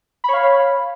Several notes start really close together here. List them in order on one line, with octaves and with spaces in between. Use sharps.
B5 C#5 F5